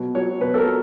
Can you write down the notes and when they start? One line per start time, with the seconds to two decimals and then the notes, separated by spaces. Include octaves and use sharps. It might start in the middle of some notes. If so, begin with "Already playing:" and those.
Already playing: B2 F#3
0.15 F#3 C#5
0.41 B2 B4
0.54 A4
0.58 A#4
0.66 F#3